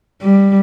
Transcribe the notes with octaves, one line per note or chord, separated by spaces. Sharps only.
G3